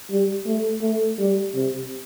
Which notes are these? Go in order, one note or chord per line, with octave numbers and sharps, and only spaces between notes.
G3
A3
A3
G3
C3